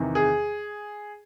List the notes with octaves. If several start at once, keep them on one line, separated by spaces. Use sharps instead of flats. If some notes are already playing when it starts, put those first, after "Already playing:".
Already playing: E2 C3 D#3
G#4